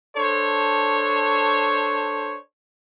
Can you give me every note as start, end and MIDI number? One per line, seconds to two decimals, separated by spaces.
0.17 2.37 62
0.17 2.37 69
0.17 2.37 72
0.17 2.37 73